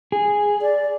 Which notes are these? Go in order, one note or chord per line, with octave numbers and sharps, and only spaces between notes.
G#4
D5